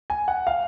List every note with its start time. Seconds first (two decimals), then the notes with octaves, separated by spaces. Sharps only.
0.10 G#5
0.28 F#5
0.47 F5